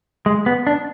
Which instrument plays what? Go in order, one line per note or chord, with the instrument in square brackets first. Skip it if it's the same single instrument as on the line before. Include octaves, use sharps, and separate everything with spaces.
[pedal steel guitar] G#3
B3
D4